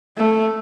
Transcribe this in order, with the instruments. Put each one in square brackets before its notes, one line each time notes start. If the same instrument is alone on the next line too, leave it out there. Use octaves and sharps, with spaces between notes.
[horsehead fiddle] A3